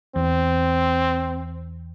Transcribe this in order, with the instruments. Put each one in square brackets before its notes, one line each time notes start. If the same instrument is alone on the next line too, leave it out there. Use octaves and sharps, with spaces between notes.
[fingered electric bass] E2 [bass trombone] C4